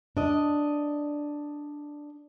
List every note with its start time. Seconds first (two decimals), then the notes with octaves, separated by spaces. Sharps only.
0.17 D4 D#5